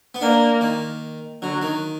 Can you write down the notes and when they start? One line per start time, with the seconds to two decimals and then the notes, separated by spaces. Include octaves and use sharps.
0.15 B3
0.21 A#3 D4
0.61 D#3
1.42 D3 F#3
1.62 D#3